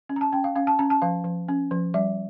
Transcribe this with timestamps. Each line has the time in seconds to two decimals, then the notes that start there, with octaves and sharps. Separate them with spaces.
0.09 C#4
0.16 A#5
0.21 A5
0.33 C#4 G5
0.44 F5
0.55 C#4 F5
0.67 A5
0.79 C#4 A#5
0.90 A5
1.02 F3 F5
1.24 F3
1.48 C#4
1.71 F3
1.94 G3 E5